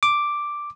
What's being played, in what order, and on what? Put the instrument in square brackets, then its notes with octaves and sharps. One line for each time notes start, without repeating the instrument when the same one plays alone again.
[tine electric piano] D6